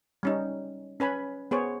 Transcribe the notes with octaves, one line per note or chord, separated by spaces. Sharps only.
G3 C#4 D#4
C#4 B4 G#5 B5
B3 G#4 C5 C#5